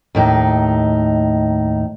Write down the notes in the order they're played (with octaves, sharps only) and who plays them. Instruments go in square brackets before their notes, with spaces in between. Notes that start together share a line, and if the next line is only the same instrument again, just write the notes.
[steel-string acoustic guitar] D#2 A2 D#4